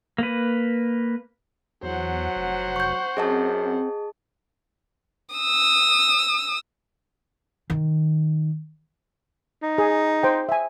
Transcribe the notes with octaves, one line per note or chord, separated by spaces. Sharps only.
A#3 B4
E2 F#3 C5 F#5
F1
C#6 G6
F#2 C4 G#4 D#5 A5
D#6 E6
D#3
D#4
G#4
C5 G5
E5 G#5